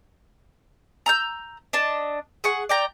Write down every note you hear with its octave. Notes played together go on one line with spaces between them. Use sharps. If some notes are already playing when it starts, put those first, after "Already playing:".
A#5 E6 G6
D4 D#5 A5
G#4 F#5 C#6
D5 G5 A#5